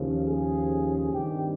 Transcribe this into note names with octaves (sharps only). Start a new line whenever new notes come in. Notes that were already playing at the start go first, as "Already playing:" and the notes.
Already playing: D#2 C#3 F3
G#4
G2 D#3 G3 C4 G4